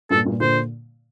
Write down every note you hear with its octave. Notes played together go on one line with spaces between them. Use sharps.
G2 A#2 A4
G2 A#2
A#2 D3 C5